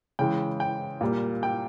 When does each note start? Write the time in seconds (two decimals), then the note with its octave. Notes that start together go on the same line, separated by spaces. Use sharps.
0.19 C#3 E3 G#3 G5
0.60 G5
1.01 A#2 G3 A#3
1.43 G5